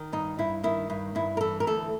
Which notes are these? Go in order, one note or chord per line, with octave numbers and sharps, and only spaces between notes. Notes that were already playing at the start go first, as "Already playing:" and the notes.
Already playing: D#3
G2 D#4
G2 E4
D#3 E4
G2
G2 E4
A#4
E3 A4
A#4
D2 A4